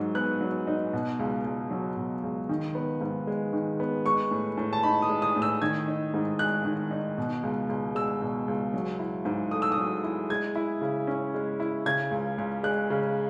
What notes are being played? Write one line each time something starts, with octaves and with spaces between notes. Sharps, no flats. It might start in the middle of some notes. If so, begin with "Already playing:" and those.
Already playing: G#2 F#3 D#4
B3 F#6
F#3
D#4
B2
C#2
C#2
F#3
B2
C#2
D#3
B3
G#2
G#3
D#3
B3
G#3 C#6
A2
A2
A5
D#4 B5
D#6
G#3
D#6
A2
E6
D#3 G#6
D#4
G#2
G#3 F#6
D#3
D#4
B2
C#2
C#2
G#3 E6
B2
C#2
F#3
E4
G#2
A3 D#6
E6
D#6
F#3
E4
G#3 G#6
E4
C#3
C#4
G#3
E4
C#3 G#6
C#2
C#2
G#3 F#6
C#3